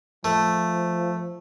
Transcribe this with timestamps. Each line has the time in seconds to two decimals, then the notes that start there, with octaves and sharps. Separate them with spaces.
0.24 F3 A3